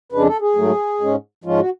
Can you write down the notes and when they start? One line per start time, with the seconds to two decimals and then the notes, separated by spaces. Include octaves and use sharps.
0.12 F2 C#3 G#3 D4 B4
0.27 A4
0.41 G#4
0.56 G#2 F#3 A3
1.01 G#2 G#3 C#4
1.44 G#2 F3 G#3 C#4 F4
1.60 F#4